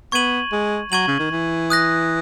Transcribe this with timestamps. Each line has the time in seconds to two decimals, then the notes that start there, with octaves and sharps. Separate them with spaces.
0.12 B3 C#6 G#6 D#7 F#7
0.52 G#3
0.92 F#3 C#6 G#6 D#7 F#7
1.07 C#3
1.19 D#3
1.31 E3
1.70 D#6 F#6 A#6